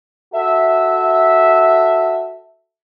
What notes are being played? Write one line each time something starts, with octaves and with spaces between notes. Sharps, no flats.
F#4 A4 E5